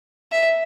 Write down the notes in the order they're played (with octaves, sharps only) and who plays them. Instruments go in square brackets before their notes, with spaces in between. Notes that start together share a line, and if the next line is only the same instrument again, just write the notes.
[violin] E5